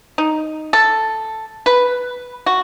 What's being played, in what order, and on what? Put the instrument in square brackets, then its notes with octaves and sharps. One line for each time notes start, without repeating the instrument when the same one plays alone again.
[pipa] D#4
A4
B4
F#4